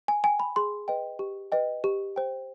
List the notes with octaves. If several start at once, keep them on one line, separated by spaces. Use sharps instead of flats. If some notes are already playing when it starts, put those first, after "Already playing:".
G#5
G5 G#5
B5
G#4 C6
B4 D#5 G5
G4
B4 D#5 G5
G4
C5 G5